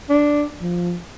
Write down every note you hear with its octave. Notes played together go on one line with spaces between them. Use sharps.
D4
F3